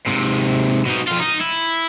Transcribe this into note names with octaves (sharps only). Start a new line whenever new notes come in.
G#2 C3
B2 D#4
F2 F4
D#4
E4